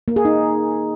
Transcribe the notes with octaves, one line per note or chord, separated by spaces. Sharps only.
A#3
G#4
D#4